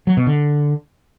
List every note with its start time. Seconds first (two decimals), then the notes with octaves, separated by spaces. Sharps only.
0.07 F#3
0.17 B2
0.27 D3